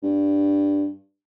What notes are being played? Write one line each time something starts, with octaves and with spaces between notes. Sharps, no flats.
G2